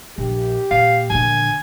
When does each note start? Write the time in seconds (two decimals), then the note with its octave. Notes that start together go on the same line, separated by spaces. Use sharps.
0.18 A#1 G4
0.71 A#2 F5
1.10 A#1 D3 G#5